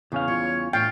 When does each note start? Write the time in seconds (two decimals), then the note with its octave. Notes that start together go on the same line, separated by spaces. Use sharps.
0.12 E2 C#3 C#4 F5
0.28 G3 F4 C#5
0.73 A2 D4 F4 C#5 G5